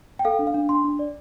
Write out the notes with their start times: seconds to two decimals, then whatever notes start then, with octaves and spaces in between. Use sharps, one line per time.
0.19 G5
0.25 A4 F5
0.39 D4
0.47 F5
0.54 D4
0.69 D4 C6
0.84 D4
0.99 D5